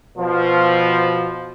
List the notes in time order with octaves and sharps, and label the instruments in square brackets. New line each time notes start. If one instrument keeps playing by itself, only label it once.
[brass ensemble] B2 F3